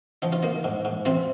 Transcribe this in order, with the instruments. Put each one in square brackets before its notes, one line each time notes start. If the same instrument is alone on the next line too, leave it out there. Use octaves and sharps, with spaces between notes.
[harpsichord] F3 D#4
F4
A#3 D#4
G#2
G#2
C3 C4 F4